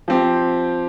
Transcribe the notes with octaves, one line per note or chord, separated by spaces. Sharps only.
F3 C4 G4